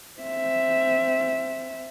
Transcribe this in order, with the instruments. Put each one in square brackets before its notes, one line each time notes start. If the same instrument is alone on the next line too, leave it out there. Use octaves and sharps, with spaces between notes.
[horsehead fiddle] C4 E5